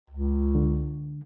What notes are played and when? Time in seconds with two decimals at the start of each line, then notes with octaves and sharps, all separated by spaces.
0.10 C#2
0.55 D3